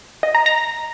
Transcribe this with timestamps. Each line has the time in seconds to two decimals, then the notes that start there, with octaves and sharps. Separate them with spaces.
0.23 D#5
0.35 A#5
0.46 A#5